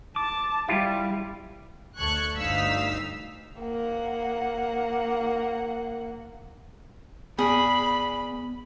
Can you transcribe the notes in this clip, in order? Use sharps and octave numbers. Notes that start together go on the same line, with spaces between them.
A5 D6
G3 E4 F4 G4
D2 A4 C#6 F#6 G#6
G1 D2 D#4 F5 E6 B6
A#3 F#5
B3 G#4 D5 B5